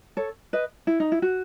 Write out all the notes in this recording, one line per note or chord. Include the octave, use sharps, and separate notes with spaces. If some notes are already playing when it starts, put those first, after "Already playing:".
A4 C#5
B4 D#5
E4
D#4
E4
F#4